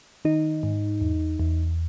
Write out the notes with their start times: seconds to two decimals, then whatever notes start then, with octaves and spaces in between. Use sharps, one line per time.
0.25 D#3 D#4
0.63 G#2
1.01 E2
1.40 E2